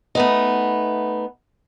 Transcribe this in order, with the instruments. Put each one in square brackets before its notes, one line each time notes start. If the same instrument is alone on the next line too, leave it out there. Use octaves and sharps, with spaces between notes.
[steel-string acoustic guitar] A3 B3 D#4